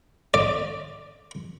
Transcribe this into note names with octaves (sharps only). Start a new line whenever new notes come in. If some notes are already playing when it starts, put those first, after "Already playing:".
D5